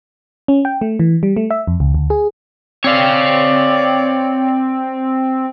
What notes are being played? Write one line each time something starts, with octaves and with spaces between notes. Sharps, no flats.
C#4
G5
A3
E3
G3
A3
E5
F2
C#2
D2
G#4
C4 C#5 D5 F5